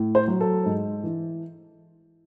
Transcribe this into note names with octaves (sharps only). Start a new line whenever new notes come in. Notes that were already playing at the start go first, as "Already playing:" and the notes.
Already playing: A2
C5
F#3
A4
G#2
E3